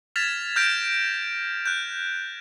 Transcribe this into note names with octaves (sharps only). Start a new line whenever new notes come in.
F6 G#6 A6 B6 E7 F7
F6 G6 A#6 B6 D7 E7
F#6 G6